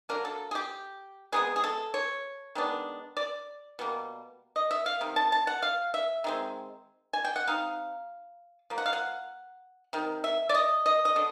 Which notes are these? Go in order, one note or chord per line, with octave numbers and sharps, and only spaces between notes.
D3 F#3 A#3 D4 A#4
A4
G#4
G4
C3 D#3 G#3 B3 G#4
G#4
A4
C#5
D#3 G#3 B3 D4
D5
B2 G3 A#3
D#5
E5
F5
C3 D#3
A5
A5
F#5
F5
E5
D#3 G#3 C4
G#5
G5
F#5
G3 C4 D#4 F5
F3 A#3
F#5
F5
F#5
C3 D#3
E5
D5
D#5
D#5
D#5
D3